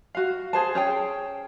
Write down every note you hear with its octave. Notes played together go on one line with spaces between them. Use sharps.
F#4 F5
G#4 C5 A5
C#4 G#4 G5